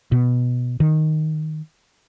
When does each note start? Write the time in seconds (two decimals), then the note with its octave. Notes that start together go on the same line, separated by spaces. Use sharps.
0.12 B2
0.80 D#3